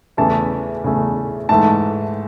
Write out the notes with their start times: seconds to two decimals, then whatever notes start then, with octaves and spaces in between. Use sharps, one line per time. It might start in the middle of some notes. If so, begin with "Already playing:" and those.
0.17 E2 C#3 E3 A3 A5
0.84 E2 C#3 E3 A3
1.49 G#2 E3 A3 A5